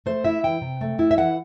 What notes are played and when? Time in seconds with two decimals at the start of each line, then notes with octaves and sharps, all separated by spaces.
0.06 A3 C5
0.24 E4 E5
0.43 E3 G5
0.61 C3
0.81 A3
0.99 E4
1.11 E5
1.18 E3 F#5